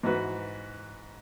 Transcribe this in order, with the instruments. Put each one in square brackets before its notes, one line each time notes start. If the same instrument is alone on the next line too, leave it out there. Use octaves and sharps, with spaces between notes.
[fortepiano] G#2 E3 F#4 B4